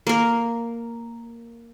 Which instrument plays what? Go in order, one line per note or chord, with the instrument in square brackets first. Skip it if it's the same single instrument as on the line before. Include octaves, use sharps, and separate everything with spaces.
[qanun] A#3 A#4